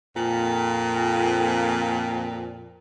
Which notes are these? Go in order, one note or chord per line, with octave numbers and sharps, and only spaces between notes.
F2 A#2